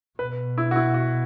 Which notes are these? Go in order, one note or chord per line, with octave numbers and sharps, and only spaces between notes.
B2 B4
E4
F#4
E4
F#4